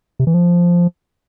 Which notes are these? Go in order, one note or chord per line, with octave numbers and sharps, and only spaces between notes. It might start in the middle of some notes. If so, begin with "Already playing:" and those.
C3
E3
F3